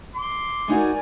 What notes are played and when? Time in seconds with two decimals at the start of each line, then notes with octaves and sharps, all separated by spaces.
0.15 C6 D6
0.68 G#3 D#4 F#4 A#4 D5 G#5